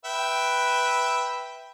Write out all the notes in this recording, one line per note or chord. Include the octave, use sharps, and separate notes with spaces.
B4 E5 G5